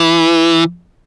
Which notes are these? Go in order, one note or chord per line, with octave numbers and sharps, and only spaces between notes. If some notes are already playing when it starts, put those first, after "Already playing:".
Already playing: E3